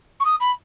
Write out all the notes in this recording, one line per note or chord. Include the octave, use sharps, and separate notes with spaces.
C#6
D#6
B5